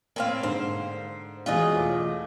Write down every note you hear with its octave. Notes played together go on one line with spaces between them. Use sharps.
A2 A#3 C4 F5
G#2 D3 C5
B2 E3 G#3 F4 G#4 D#5
E2 A3 D6